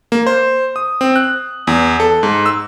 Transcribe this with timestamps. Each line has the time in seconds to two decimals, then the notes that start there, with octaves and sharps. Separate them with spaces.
0.12 A#3
0.27 C5
0.76 D#6
1.01 C4
1.16 F#6
1.67 E2
2.00 A4
2.23 G#2
2.46 E6